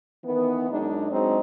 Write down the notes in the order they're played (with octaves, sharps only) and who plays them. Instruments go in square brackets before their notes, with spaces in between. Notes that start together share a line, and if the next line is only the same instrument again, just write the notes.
[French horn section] D#3 E3 B3
F#2 G#3 D4 D#4
F#3 G#3 C4 D4 D#4